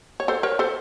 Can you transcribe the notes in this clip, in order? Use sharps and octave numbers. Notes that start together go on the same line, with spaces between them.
C#5
A4 C5
A#4 C#5
A4 C5